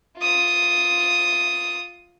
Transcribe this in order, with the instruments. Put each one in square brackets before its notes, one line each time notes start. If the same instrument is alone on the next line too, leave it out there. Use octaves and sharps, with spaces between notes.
[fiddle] F4 D#6